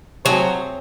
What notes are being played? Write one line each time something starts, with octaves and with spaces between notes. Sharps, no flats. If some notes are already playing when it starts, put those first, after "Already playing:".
F#3 A3 C4 E4 G#4 C#5